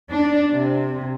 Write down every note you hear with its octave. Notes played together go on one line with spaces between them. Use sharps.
D4
C3